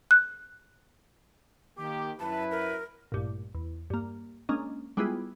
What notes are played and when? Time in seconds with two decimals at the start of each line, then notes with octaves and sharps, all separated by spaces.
0.11 F#6
1.78 D#3 A#3 G4 D6
2.20 F#2 E4 B4 A5
2.51 A#4
3.12 A1 G2 A#2
3.55 E2
3.90 G2 A#3
4.49 G#3 A#3 C#4 D4 D#5
4.97 G3 G#3 B3 E4 F4 G#4